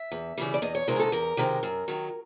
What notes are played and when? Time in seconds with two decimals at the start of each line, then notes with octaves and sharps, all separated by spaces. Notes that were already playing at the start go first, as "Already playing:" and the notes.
Already playing: E5
0.12 E2
0.38 C#3 E3 G3
0.54 D5
0.62 E2 D#5
0.75 C#5
0.88 C3 D#3 G#3 A#4
0.96 G#4
0.99 A4
1.12 E2 A#4
1.37 C3 D#3 G#3
1.63 F#2
1.88 D#3 F#3